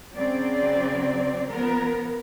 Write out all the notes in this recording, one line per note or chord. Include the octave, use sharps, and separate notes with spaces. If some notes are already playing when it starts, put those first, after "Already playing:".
C#3 F#3 C4 D5
F3 B3 A#4